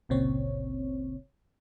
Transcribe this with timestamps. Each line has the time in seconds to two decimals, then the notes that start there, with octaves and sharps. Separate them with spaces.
0.09 G1 C#2 A#2 C#3 C4 C#5